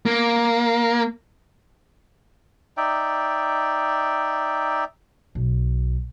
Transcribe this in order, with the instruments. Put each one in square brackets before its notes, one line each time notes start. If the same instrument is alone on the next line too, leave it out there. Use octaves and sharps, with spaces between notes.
[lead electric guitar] A#3
[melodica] D#4 D5 E5 G5
[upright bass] B1